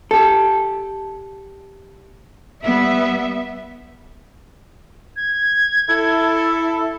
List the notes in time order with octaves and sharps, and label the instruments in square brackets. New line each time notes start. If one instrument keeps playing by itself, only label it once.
[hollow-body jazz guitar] G4 A4
[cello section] G3 B3 E5
[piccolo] G#6
[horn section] E4 A4